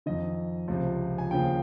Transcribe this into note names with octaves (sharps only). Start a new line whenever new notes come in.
F2 D#3 D#5
C#2 C3 F3
G#5
D#2 C#3 F3 G5